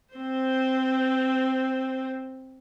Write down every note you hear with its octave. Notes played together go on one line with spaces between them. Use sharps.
C4 C5